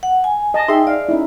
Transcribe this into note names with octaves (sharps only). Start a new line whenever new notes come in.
F#5
G#5
D#5 A5 D#6
D#4 G#4 E5 G5 C6
D5 F5
C#4 D#4 E4